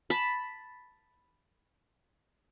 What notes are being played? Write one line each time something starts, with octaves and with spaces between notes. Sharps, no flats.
A5 B5